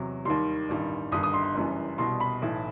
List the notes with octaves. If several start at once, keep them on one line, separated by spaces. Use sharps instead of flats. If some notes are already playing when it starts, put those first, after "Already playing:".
Already playing: E2 C3 F#3
D#2 D#3 G3 C6
A1 G2 D#3 G3
G1 G2 D#3 G3 D#6
D#6
C6
C6
F#1 F#2 E3 G3
C2 B2 G3 C6
B5
B1 A2 E3